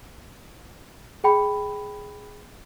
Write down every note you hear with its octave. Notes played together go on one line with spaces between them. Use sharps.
G#4 G5 B5